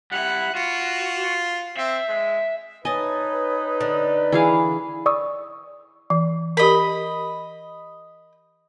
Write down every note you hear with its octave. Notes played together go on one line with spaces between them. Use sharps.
G3 E4 F#5
F4 F#4
C4 E5
G#3
D#4 B4 C#5 D#5 G#5 A5 D#6
D3
E3 G#4 F5
D5 C#6 D#6 E6
E3
G4 A#4 D#5 B5